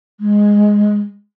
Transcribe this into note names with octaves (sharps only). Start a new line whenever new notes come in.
G#3